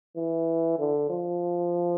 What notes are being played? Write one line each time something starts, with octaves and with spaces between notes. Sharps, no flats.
E3
D3
F3